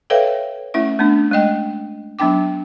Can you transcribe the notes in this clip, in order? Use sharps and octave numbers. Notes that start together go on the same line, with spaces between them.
A4 B4 C#5 E5 F5 G5
A3 C#4 E4 E5
A3 B3 D4
G#3 A3 D#5 G5
F#3 B3 D4 G5 D6